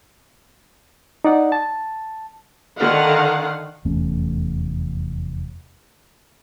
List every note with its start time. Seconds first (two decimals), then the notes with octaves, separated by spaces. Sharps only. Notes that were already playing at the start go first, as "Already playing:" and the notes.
1.25 D#4 D5 F#5
1.52 A5
2.78 D3 D#3 F5 F#5
3.85 F1 E2 A3 C#4